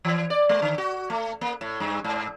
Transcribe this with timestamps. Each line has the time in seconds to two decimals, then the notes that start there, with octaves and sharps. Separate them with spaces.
0.05 E3
0.30 D5
0.49 G#3
0.62 D3
0.78 F#4
1.10 A3
1.41 A#3
1.61 A2
1.80 G2
2.04 G#2